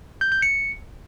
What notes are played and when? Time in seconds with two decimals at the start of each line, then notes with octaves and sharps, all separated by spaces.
0.21 G6
0.32 G6
0.42 C#7